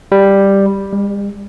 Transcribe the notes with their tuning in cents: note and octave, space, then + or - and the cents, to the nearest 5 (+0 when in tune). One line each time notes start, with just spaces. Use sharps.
G3 +5
G3 +45